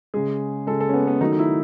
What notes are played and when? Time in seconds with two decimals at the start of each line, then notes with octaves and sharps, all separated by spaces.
0.14 C#3 G#3 G#4
0.67 C#3 G#3 A4
0.80 A4
0.89 C#4
0.94 B3
1.07 B3
1.21 D#3 F#3 A3 D#4
1.32 D#4
1.39 E4